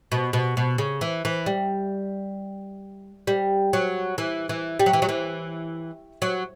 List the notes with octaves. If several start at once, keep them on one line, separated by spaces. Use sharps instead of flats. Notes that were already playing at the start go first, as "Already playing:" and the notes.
B2
B2
B2
C#3
E3
E3
G3
G3
F#3
E3
E3
G3
F#3
E3
F#3
E3
F#3